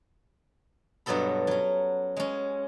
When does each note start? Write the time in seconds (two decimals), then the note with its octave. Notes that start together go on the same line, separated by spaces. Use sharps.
1.06 G2 B2 F#3 B3 A4 B5
1.47 F#3 C#4
2.17 G#3 C#4